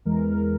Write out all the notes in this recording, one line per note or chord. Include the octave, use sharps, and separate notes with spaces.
E2 E3 G#3 A#4
A#4